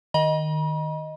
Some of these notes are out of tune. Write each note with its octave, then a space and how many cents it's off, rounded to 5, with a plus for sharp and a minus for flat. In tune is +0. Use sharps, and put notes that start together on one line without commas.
D#3 -15 D#5 +0 B5 -45